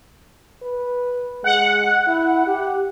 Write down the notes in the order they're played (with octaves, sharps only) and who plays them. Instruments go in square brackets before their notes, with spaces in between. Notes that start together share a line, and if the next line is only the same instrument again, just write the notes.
[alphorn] B4
[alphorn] G#3 [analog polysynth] F#5
[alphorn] E4
G4